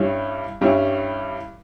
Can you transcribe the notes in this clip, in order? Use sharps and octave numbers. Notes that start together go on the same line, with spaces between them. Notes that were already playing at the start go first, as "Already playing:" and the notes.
Already playing: G2 G3 C#4 E4
G2 G3 C#4 E4